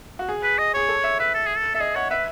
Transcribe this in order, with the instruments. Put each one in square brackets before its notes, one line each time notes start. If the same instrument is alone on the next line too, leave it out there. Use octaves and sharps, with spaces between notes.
[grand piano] F#4
G#4
[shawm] B4
D#5
[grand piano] G#4 [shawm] C#5
[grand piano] A4
E5
[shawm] B4 [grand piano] E5
[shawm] A4
G#4
A4
[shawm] A4 [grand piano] E5
[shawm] G#4 [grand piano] D#5
[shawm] C#5 [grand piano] F#5
[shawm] B4 [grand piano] E5